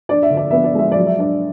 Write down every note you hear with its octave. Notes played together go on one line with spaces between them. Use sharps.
D4 D5
E5
D3
D5
B3 E5
D5
G#3 E5
F#3 D5
E5
D4 D5